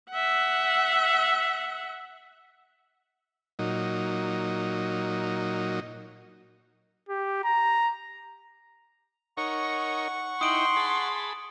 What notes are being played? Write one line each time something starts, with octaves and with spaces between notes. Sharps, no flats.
E5 F#5
A#2 F#3 D#4
G4
A#5
D#4 A#4 C#5 F#5 C#6
D#4 E4 G5 C6 D#6 D7 F#7
G#4 A5 B5